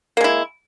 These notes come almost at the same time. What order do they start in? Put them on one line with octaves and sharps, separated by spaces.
A#3 G#3 E4